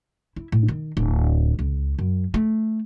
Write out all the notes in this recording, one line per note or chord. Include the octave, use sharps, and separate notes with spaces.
E4
A2
D#3
D1
C#2
F#2
A3